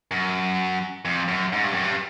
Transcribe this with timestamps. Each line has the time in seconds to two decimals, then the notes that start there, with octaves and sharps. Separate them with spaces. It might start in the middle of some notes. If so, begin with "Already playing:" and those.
0.11 F#2
1.05 F2
1.28 F#2
1.53 G#2
1.63 G2
1.73 F#2
1.84 G2